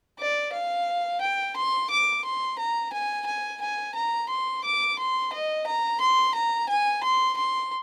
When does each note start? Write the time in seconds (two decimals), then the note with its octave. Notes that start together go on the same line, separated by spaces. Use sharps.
0.19 D5
0.53 F5
1.21 G5
1.56 C6
1.91 D6
2.25 C6
2.59 A#5
2.93 G#5
3.27 G#5
3.62 G#5
3.95 A#5
4.29 C6
4.65 D6
4.99 C6
5.33 D#5
5.67 A#5
6.00 C6
6.35 A#5
6.69 G#5
7.03 C6
7.37 C6